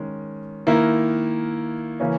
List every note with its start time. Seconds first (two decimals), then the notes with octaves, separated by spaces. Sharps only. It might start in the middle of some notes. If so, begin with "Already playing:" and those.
Already playing: D#3 G#3 C#4
0.67 D#3 A#3 E4
2.00 C#3 E3 A#3 C#4